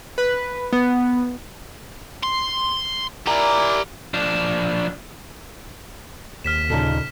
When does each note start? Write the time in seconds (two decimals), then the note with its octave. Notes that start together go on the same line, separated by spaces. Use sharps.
0.18 B4
0.73 B3
2.23 C6
3.27 E4 G4 A#4 D5 G#5 A#5
4.14 F3 D4
6.44 D#2 F6 B6 E7
6.70 D2 A#2 C#3 D#4 A4